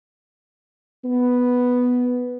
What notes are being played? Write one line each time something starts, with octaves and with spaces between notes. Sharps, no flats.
B3